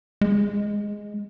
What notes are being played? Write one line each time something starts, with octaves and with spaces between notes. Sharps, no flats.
G#3